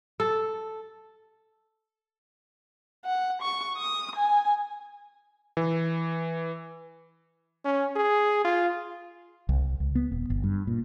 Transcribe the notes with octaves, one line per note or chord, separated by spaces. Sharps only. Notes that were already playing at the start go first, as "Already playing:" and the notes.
A4
F#5
C#6
D#6
G#5
E3
C#4
G#4
F4
C2
C#2
B3
D#1
G1
G2
A#2